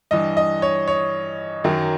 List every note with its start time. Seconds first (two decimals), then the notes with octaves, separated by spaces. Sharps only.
0.11 G2 E3 D#5
0.37 D#5
0.62 C#5
0.88 C#5
1.64 F#2 D#3 F#3